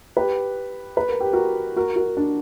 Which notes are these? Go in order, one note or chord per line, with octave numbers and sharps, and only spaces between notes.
G4 B4
B4
A#4
G4
F#4 A#4
F#4 A#4
F#4 A#4
D4